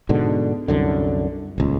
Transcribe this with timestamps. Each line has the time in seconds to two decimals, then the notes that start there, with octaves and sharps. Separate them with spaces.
0.09 G#2 B2 D3
0.68 C2 F#2 D3
1.58 D#1 C#2